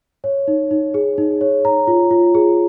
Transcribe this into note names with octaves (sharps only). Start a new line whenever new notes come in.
C#5
D#4
D#4
G#4
D#4
C#5
A#5
F4
F4
G#4